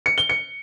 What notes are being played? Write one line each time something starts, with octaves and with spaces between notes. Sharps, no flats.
C#7
G7
C#7